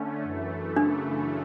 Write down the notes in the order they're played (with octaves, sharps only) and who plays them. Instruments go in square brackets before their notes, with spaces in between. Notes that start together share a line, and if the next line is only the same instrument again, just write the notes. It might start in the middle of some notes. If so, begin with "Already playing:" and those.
Already playing: [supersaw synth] D3 A3 C#4 [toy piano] D4
[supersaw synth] F#2 E3 A3
[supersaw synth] F#2 C#3 E3 A3 [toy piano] D4